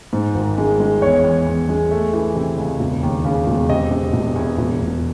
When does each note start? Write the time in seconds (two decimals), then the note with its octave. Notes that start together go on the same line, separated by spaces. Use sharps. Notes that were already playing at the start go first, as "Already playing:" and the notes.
0.13 G#2
0.35 G#1
0.58 G#3
0.80 G#3
1.02 E2 C#5
1.24 E2
1.46 E2
1.69 G#3
1.91 A3
2.13 E3
2.36 C3
2.57 C#2
2.80 E1
3.03 D#2
3.25 C#3
3.47 E1
3.69 C3 D#5
3.91 C3
4.13 E1
4.36 E2
4.58 E1
4.81 E1